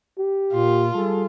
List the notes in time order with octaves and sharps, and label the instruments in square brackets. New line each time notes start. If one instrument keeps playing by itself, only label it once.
[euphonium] G4
[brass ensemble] A#2 [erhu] F4
[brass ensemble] G3 G#4 A4